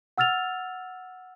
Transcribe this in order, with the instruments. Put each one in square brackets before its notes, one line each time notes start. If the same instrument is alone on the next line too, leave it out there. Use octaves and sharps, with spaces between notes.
[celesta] F#5 E6 F6 A6 F7